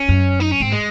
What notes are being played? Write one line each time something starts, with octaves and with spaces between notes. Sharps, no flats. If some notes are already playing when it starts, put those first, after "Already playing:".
Already playing: C#4
F#2
D#4
C#4
G#2 C4
G#3